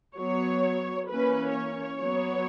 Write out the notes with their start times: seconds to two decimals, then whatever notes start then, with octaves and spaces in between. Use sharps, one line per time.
0.16 F#3 B3 C#5
1.08 E3 A#3 C#4 B4
1.55 C#5
2.01 F#3 B3